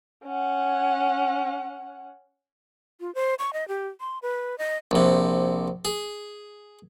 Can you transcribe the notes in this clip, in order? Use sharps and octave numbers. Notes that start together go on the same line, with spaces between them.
C#4 F#5
F4
C5
C#6
D#5
G4
C6
B4
D#5
A#1 C3
G#4